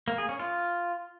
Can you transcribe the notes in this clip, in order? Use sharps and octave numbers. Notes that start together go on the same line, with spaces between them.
A#3
G#4
C#4
F4